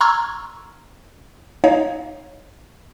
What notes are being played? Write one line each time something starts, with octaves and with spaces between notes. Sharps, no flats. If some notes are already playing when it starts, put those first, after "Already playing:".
A#5 C6 C#6 E6 F6 G#6
D#4 C#5 D#5 F5